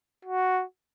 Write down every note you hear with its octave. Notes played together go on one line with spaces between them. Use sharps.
F#4